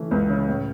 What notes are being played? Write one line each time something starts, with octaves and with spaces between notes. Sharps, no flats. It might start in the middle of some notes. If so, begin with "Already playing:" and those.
Already playing: C#3 E3 A3
C#2
C#3
A2